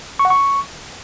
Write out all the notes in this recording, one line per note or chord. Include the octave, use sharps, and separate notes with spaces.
C#6
F#5
C#6